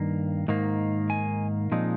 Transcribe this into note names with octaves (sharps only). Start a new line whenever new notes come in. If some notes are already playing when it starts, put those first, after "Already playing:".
Already playing: G2 D#3 A#3
G#2 D#3 A#3
G#5
A#2 F3 G#3 C4 D#4